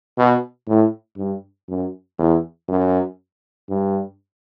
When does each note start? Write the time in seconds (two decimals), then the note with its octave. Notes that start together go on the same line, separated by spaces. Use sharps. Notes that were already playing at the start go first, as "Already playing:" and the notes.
0.18 B2
0.67 A2
1.17 G2
1.69 F#2
2.18 E2
2.68 F#2
3.69 G2